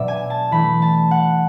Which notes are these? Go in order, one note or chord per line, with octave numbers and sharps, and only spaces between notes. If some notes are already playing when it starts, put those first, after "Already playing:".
Already playing: B2 F#3 B3 D4 D5 E5
G#5
A5
E3 A3 E4 B5
A5
F#5